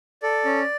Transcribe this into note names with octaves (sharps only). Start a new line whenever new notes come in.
A4 D5
C#4